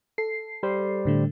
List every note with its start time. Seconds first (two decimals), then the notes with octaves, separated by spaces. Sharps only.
0.18 A4 C7
0.63 G3 C5
1.05 A2 D3 A3